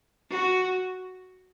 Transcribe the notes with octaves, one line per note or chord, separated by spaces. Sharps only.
F#4